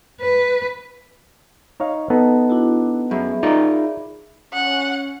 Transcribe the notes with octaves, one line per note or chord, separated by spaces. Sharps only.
B4
D#4 C#5 F5
B3 D#4 A4
D4 E4 F#4
F#2 G#4 E5 B5
D#4 F4 A#4 D5
C#4 F#5